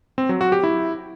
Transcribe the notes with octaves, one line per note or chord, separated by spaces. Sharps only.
C4
F#3
F#4
G4
E4